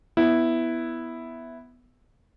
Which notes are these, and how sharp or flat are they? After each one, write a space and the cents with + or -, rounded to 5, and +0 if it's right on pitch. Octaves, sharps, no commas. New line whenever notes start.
B3 +0 E4 +0